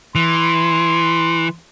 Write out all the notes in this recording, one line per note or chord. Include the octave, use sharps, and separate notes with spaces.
E3 C6